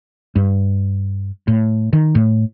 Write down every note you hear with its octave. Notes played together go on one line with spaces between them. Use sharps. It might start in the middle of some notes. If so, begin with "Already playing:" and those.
G2
A2
D#3
A2